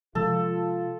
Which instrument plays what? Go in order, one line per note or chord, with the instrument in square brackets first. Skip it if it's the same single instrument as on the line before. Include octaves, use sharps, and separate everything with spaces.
[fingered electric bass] C3 F3 G#3 [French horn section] F4 [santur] A4